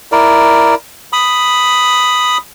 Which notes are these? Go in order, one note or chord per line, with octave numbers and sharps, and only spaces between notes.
E4 A#4 D5
B5 D#6